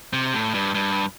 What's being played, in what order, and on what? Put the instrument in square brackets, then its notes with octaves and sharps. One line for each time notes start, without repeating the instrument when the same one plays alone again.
[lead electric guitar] C3
A2
G2
G2